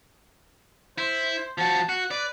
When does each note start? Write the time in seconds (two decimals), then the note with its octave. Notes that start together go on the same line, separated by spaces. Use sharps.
0.98 E4 C5
1.58 F3 F#4 A5
1.89 F#4 F#5
2.11 B4 D5